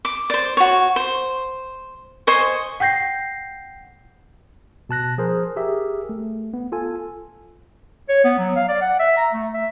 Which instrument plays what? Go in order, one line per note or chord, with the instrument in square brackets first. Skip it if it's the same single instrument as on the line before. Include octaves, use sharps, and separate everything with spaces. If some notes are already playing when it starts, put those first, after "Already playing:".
[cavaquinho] D6
C5 D5
F#4 C#5
C5
C5 D#5 G#5 C#6
[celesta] F#5 G5 G6 A#6 C7
[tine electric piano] B2 A5 F#6 A#6
F3 G#4 A#4 C5
G4 G#4 A#4 E5
A3
B3
F4 A4 G#5
[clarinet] C#5
B3
F#3
F5
D5
F#5
E5
A#5
A3
E5